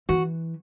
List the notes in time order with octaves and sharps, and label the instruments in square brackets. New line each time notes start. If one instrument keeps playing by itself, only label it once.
[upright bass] E3 [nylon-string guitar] F#4